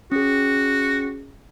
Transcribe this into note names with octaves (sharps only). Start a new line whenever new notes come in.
C#4 F#4 G#4